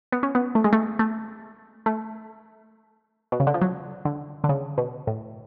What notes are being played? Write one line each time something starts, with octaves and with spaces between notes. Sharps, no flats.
B3
C#4
B3
A3
G#3
A3
A3
A3
B2
C#3
D3
F3
F#3
D3
D3
C#3
B2
A2